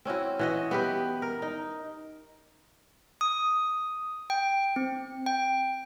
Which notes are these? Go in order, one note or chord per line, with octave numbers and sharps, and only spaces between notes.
C4 C#4 E4 F#4
E3 F#4 D#5
B3 G4 B4
A#4
D#4
D#6
G5
C4
G5